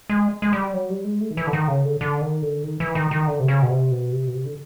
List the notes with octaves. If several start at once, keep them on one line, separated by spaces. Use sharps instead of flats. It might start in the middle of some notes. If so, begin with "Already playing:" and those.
G#3
G#3
G3
F#3
G3
G#3
A3
D#3
E3
D3
D#3
C#3
D3
D3
D#3
D3
D#3
E3
D#3
D#3
D3
C3
C#3
B2
C3
B2
C3
B2
C3
D3